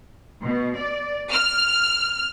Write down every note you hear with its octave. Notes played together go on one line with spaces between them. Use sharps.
B2
D5
F6